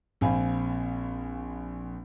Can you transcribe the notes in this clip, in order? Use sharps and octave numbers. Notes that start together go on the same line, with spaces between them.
A#1 C4 F5 G#5 B5